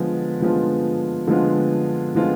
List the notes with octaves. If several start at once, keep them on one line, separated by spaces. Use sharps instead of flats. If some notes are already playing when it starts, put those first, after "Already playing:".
Already playing: D3 F3 G#3 B3 F4
D3 F3 G#3 B3 F4
D3 F3 G#3 B3 F4
D3 F3 G#3 B3 F4